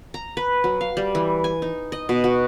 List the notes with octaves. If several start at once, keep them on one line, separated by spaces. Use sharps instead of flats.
A#5
B4
F#3
F5
G3
E3
G#5
D#4
D#5
B2
F#4